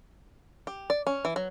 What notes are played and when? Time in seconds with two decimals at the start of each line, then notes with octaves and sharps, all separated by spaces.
0.67 G4
0.90 D5
1.07 C#4
1.25 E3
1.36 F#3